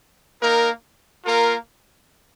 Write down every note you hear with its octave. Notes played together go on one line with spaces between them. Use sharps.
A#3 D#4 A#4
A#3 F4 A#4